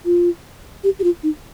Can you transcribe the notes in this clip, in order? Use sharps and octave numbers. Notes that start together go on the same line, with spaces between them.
F4
G4
G4
F4
D#4